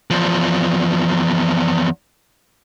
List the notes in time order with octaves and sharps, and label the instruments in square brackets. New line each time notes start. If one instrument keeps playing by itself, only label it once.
[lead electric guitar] E2 F3